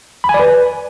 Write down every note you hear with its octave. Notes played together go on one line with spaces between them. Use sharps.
B5
G#5
D5
B4